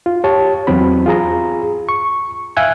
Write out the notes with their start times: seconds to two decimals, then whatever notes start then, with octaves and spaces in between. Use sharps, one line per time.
0.06 F4
0.24 G4 C#5 A5
0.67 E2 E3 F#3 C4 B5
1.06 F4 G#4 A#5
1.89 C#6
2.57 E5 F5 G#5 F#6 G#6